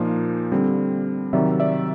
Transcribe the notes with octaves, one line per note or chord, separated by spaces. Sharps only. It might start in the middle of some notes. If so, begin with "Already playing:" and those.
Already playing: A#2 F3 A#3 D#4 F5
D3 G3 C4
C3 D#3 F#3 D5 E5
D5 E5